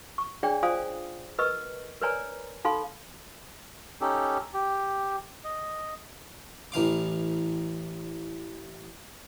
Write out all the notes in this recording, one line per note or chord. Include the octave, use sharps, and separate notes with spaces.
C#6
D4 G#4 C#5 D5 G5
F4 C5 D5 F5 G#5 D#6
A#4 B4 D#5 C#6 E6
A#4 B4 C#5 D5 G#5 A#5
D#4 A4 F5 B5 C6
C#4 D#4 G4 A4
G4
D#5
A1 E3 F5 D6